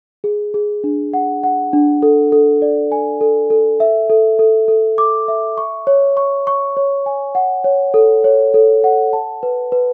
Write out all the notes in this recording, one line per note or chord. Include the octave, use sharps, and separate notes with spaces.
G#4
G#4
D4
F#5
F#5
D4
A4
A4
D5
G#5
A4
A4
E5
A4
A4
A4
D6
E5
C#6
C#5
C#6
C#6
C#5
G#5
F#5
C#5
A4
C#5
A4
F#5
A5
B4
B4